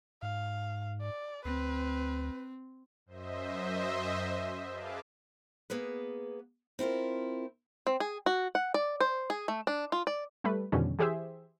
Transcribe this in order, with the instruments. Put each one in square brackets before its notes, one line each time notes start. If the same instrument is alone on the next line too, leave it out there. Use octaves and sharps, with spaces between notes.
[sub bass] G#2 [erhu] F5
[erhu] D5
[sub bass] D2 [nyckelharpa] C4 [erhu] B4
[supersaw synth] F#2 C5 D#5 E5
G#4 B4 F5 A5 D6
[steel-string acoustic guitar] A#3 B3 G#4 B4
C4 E4 F4 A#4
[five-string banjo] C4
G#4
F#4
F#5
D5
C5
G#4
A3
D4
F4
D5
[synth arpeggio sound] G3 A3 B4
F2 B2 D3 D#3 G3 C#4
E3 G4 G#4 C5 E5